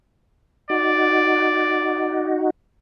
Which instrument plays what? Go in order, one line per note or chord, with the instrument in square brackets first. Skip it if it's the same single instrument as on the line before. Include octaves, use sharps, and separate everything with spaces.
[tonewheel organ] D#4 F#4 [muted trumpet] D5